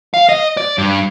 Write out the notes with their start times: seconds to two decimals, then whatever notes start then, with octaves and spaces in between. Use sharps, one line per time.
0.14 F5
0.29 D#5
0.57 D5
0.78 G2